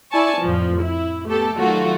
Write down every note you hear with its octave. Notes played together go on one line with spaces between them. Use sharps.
E4 D5 G#5 A5 C#6
F2 A2 F3
E4
A3 B3 G4 A4
D#3 F#3 A3 F4 F#4